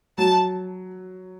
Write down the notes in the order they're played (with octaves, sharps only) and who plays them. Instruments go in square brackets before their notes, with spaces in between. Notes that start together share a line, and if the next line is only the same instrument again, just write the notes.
[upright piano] F#3 [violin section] A5